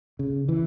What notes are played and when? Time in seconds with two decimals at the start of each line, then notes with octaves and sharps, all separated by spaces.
0.19 C#3
0.48 E3